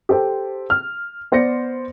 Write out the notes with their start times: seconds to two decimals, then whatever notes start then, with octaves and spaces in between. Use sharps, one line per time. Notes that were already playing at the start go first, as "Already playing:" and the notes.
0.09 G4 A4 C5 G5
0.70 F6
1.32 B3 C5 D5 A#6 C#7